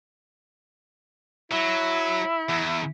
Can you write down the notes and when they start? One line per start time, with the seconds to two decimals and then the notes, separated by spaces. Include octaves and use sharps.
1.52 F#3 E4
2.49 E2